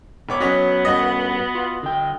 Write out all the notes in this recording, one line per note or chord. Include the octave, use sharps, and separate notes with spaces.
E1 B3 C#5 D6
C#4 F#4 C#5 D#5 B6
G2 C#4 F#4 D#5
F4
D3 G5